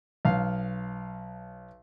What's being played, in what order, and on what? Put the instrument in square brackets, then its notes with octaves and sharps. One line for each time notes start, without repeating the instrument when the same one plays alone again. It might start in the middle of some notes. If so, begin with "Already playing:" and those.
[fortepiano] B1 F5